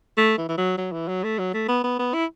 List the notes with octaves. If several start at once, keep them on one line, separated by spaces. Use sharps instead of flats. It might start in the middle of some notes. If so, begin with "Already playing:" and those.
A3
E3
E3
F#3
F#3
E3
F#3
A3
F#3
A3
B3
B3
B3
E4